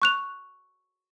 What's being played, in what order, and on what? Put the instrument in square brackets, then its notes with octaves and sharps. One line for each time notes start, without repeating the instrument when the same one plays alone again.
[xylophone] C#6 F#6 F7